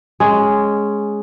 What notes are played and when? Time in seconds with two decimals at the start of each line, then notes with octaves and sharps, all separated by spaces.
0.20 G#3 C#4